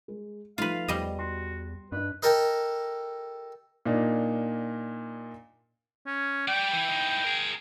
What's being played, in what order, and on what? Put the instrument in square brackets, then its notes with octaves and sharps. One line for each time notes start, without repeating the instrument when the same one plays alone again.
[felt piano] G#3
[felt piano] F3 A3 D#4 [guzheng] F4 B4 [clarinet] F5
[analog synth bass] E2 [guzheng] G3 D#5
[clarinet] F#4 [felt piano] C6
[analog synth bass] G2 [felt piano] D4 D#5 [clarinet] B4
[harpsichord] G4 A4 A#4 D#5
[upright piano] A#2 A#3 D4 D#4
[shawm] C#4
[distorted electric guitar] G3 D5 [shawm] G5
[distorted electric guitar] E3 E4
E3 D#4
G#4 A#4